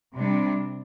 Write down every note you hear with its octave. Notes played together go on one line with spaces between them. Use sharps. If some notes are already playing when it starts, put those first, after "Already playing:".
C3 G3 D4